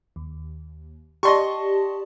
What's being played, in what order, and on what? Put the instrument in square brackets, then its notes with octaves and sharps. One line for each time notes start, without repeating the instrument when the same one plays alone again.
[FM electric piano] D#2
[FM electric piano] G4 D5 A5 [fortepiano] D#5 C6 C#6